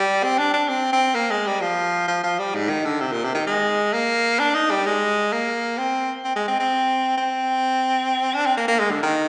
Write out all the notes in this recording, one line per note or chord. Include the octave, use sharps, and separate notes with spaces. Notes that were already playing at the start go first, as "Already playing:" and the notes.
Already playing: G3
C4
D4
D4
C4
C4
A#3
G#3
G3
F3
F3
F3
G3
G#2
D#3
D3
C3
A#2
C3
D#3
G#3
A#3
D4
D#4
G3
G#3
A#3
C4
C4
G#3
C4
C4
C4
D4
C4
A#3
A#3
G#3
D3
D#3